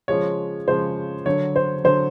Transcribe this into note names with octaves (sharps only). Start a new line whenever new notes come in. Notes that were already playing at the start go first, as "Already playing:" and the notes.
C#3 F3 G#3 C#5
C#3 F3 G#3 C5
D3 F#3 C#5
C5
D3 F#3 C5